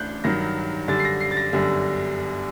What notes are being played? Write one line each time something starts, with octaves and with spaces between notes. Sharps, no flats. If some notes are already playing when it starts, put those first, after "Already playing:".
Already playing: A1 A2 D4 F#6 G6
G2 D#3 F#3 A#6
F#2 D3 G3 A6
C7
A#6
C7
A6
A#6
G1 F#2 D3 G3